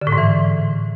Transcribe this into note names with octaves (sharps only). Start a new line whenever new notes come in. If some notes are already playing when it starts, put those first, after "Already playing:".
D3
A2
G#2
E3